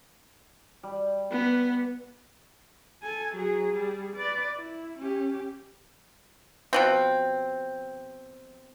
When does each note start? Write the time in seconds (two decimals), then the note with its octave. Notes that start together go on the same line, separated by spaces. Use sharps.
0.83 G3
1.32 B3 B4
3.02 A4 G#5
3.35 F#3 G#4
3.74 G3 G#4
4.16 B4 D5
4.55 E4
4.99 C#4 G4
6.73 B2 F3 C4